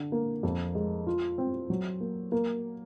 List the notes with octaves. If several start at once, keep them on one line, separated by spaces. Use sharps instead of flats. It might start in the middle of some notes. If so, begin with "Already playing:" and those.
Already playing: D3
A#3
F2
G#3
F4
C4
F#3
A#3
A#3